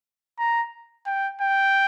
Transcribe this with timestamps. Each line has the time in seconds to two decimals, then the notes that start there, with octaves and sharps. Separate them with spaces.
0.39 A#5
1.06 G5
1.41 G5